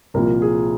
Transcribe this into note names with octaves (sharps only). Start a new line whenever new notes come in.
C2 A#2 F3 A#4
G#4